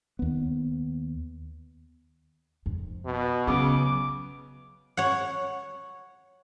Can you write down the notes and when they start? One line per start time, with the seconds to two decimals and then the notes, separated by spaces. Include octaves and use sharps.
0.19 D#2 B3
2.66 F2
3.05 B2
3.47 C#3 F#3 B3 D6
4.97 C#5 F#5